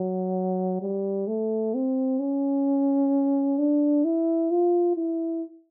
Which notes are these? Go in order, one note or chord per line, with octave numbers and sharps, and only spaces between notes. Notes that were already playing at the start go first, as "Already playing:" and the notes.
Already playing: F#3
G3
A3
C4
C#4
D4
E4
F4
E4